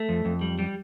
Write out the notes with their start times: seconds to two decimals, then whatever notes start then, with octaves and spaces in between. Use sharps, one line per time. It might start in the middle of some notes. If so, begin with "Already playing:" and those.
Already playing: A3
0.09 F2
0.25 F2
0.41 G3
0.59 G3